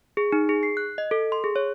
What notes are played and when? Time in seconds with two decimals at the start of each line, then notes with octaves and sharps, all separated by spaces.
0.17 G#4
0.32 D#4
0.49 G#4
0.63 C7
0.77 F#6
0.98 D#5
1.11 A4
1.32 C6
1.44 G#4
1.56 C#5